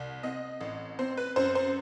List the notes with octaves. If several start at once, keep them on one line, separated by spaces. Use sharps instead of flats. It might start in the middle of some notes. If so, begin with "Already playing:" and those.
Already playing: C2
C4 D#5
A1
C4 C5
B4
F#2 C5
C5